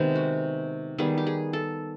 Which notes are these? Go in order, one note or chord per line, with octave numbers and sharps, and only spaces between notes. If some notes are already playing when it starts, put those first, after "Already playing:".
Already playing: C3 D#3 G#3 B3
F#4
D#3 G3 B3 G#4
G4
G#4
A4